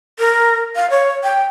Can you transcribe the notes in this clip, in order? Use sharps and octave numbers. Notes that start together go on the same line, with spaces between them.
A#4
F5
C#5
G5